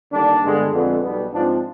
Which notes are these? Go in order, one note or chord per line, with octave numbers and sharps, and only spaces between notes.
D#2 D3 G3 D4
G2 D3 G#3 B3
F2 D3 G#3 B3
B1 B2 G3 B3
G#2 F3 G#3 C4 D4